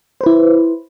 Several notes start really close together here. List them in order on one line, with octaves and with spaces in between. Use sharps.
C5 B4 E4